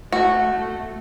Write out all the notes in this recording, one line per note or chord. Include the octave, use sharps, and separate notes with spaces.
A3 F#4